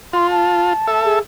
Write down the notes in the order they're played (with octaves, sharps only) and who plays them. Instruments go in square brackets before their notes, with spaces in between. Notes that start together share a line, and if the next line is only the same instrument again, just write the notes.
[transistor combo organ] F4 [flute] C6
[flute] A5
[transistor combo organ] A4 E5
[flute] G#4